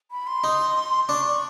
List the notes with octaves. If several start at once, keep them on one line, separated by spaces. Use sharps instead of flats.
B5
C6
D#4
D4 C#6